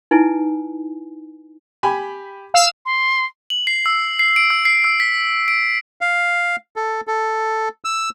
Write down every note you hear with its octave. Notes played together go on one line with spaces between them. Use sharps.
D#4 E4 B4 G#5
G4 G#5 B5
F5 E6
C6
F#7
C7
E6
C7
D7
E6
C7
E6
B6
D7
F5
A4
A4
E6